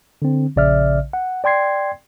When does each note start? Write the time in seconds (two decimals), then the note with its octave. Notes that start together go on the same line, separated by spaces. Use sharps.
0.22 D3 C4
0.56 A#1 C#3 D5 E5 F6
1.13 F#5
1.44 D5 G5 C6 G#6 C7